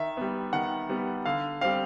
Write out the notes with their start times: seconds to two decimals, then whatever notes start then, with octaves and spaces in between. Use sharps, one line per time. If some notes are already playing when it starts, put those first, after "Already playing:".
Already playing: D#3 E5
0.17 G3 B3
0.53 D#3 F#5
0.89 G3 B3
1.26 D3 F5
1.61 G3 C4 F5